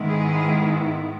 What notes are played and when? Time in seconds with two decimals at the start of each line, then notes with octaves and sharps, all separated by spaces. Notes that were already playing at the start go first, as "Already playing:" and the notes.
Already playing: G#2 D#3 G#3 B3 E4
0.09 G#4